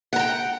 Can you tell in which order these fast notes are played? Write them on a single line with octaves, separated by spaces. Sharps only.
F#5 A#5 G5